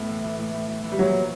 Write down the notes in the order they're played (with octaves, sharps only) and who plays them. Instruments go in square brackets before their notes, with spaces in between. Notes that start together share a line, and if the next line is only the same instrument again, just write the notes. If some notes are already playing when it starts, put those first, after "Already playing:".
Already playing: [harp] A2 B3
E3
E3
A2
A2
E3
E3
[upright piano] G3
[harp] A#2 [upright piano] F#3
[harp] F3